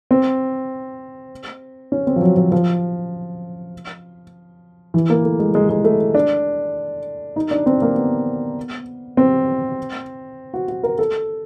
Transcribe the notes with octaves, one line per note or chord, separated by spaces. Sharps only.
C4
C#4
C4
F3
F#3
F3
F3
E3
A#3
A3
G#3
G#3
G#3
A3
D4
D#4
D4
C4
A#3
B3
C4
F#4
F#4
A#4
A4